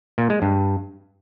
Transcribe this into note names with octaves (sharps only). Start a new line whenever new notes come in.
A#2
G#3
G2